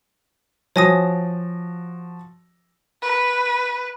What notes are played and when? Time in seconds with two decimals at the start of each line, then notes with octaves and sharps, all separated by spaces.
0.76 F3 F#4 C#5 G#5 D#6 A#6
3.02 B4